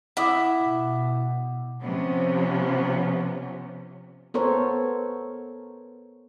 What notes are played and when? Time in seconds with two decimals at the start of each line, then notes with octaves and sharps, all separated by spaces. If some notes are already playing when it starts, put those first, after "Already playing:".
0.17 E4 E5 F#5 D6 D#6
0.61 B2
1.81 C3 F3 B3 C#4
4.34 B3 A4 A#4 C5 C#5